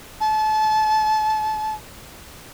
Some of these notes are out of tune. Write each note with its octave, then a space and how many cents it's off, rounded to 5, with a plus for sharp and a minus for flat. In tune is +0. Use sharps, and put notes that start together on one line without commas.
A5 -30